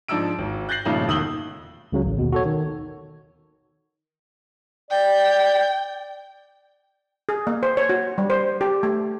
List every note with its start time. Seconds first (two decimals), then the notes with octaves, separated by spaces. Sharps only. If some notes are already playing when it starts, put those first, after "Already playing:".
0.08 G#2 F3 D4 D#4 E6 D7
0.38 G#1
0.69 F#6 G6 A6 A#6 C7 F#7
0.85 G2 A#2 C#3 F3 A3 D#4
1.08 E1 D#3 D#6 E6 F#7 G7
1.92 C#2 C#3 F#3
2.05 A1
2.18 D#2 B2
2.32 F#4 A4 C#5
2.45 D#3
4.91 D5 G5
7.29 G#4
7.47 A#3
7.63 C5
7.77 C#5
7.89 F#4
8.18 G3
8.30 C5
8.61 G4
8.83 A3